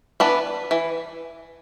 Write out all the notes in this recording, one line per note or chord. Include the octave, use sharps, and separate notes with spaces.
E3 B3 D4 B4
E3